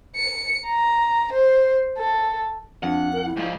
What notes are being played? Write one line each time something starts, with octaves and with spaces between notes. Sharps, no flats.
C#7
A#5
C5
A4
F2 D4 F#5
A#4
E4
G#2 F3